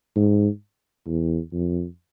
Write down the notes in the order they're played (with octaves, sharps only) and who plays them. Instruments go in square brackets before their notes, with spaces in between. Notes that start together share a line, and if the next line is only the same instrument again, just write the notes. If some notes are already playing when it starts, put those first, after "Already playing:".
[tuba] G#2
E2
F2